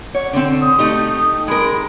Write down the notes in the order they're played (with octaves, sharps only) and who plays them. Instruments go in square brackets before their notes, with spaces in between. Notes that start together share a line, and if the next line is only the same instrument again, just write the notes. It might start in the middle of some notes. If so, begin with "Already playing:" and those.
[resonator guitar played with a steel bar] C#5 [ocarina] F#5
[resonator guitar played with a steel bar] D3 C4
[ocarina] D#6
[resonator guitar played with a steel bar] A3 D#4 G4
[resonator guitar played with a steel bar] G#3 A#4 [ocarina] B5